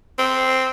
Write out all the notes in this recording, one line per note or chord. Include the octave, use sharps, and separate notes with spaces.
C4